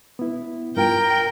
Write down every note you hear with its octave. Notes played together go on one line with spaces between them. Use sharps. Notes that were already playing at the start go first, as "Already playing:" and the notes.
B3 E4
G2 F4 A#4 G5